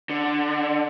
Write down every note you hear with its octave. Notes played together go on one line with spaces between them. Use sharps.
D3